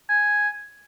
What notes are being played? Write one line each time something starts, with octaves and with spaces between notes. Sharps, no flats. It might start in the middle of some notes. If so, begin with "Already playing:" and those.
G#5